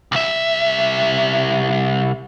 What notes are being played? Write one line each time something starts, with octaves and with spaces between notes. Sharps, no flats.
C2 E5